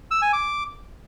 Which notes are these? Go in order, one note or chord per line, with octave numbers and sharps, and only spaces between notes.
E6
G#5
D6